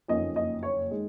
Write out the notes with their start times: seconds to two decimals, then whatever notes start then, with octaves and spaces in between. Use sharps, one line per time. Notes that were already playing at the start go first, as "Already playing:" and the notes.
0.08 F#1 F2 D#3 A#3 C#4 D#5
0.36 D#5
0.63 C#5
0.91 D#3 G#3